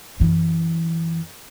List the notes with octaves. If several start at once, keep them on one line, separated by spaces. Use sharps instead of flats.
F#2 E3